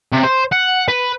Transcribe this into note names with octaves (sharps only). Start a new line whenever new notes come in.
C3
C5
F#5
B4